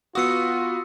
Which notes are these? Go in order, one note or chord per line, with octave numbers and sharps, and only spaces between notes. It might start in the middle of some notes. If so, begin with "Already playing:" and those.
B3 F4 F#4 D#6 E6 C#7